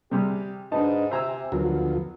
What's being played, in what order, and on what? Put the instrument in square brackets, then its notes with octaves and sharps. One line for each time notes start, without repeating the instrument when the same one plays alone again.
[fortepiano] C3 G3 G#4 [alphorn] G4
[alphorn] G#2 [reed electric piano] D4 B4 D#5 [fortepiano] D#4 A5
[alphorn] C3 [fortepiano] C5 A#5 [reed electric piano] E5 G#5 E6
[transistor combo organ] D2 F3 [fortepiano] F#3 A#4 [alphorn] B3 [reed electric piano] F#4